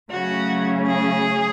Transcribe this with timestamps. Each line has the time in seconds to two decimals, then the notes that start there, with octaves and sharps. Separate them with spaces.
0.10 C#3 F#3 A3 C#4 F#4
0.87 G#4